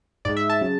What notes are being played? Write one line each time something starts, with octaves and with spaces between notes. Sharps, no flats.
G#2 G#3 D5
E5
A5
C#3 F#3